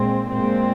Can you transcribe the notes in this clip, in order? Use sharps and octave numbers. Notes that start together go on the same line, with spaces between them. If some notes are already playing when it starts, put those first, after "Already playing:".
Already playing: A#2 G#3 C4
A#2 G#3 C4